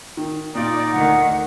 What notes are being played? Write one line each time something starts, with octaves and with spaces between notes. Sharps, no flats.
D#3
A#2 D#4 F4 D5
D2 D#3 F#5